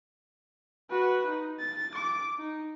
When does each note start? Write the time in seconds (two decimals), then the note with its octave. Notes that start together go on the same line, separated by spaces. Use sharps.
0.90 F#4 B4
1.26 D#4
1.59 A6
1.94 D6
2.38 D#4